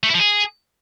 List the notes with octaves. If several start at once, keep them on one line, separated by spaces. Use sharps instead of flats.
A3
E4
F3
G#4